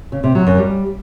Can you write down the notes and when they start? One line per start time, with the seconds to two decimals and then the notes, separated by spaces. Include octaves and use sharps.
0.12 C#3
0.24 C3
0.35 F#3
0.47 F#2
0.58 G3